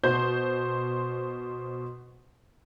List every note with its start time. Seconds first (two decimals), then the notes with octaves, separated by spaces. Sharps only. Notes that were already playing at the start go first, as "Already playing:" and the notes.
0.04 B2 C5 C6 G6